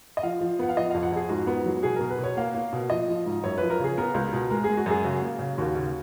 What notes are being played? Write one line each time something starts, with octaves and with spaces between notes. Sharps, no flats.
D#5
F3 F5
F3
B3 F#5
F5
F3 D#5
F2 F5
F#5
F2 G#4
G#2 F#4
B3
F#3
B2 G#4
B2 A#4
B4
B2 C#5
A#3 F5
A#3
B2
F3 D#5
F3
G#2
F#2 C#5
F3 B4
A#4
C#3 G#4
B3 A#4
C#2
B2
G#3 A#4
G#3 G#4
F#4
F#2 G#4
C#3 F#4
A#3
C#3
D#2 F#4
C#3